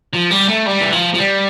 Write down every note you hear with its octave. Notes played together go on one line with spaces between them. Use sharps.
F3
G3
A3
G3
E3
F3
F3
G3